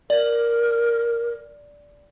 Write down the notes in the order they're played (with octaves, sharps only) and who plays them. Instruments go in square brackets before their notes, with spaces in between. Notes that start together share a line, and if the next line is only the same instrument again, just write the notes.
[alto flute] A#4 [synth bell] D5